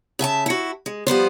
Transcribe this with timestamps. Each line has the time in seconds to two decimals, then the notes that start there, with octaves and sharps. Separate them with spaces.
0.19 C#3 E5 G#5 A5
0.46 E4 F#4
0.86 G#3
1.07 F3 G3 B3 C5